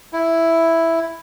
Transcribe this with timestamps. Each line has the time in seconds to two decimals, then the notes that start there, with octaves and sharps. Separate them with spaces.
0.13 E4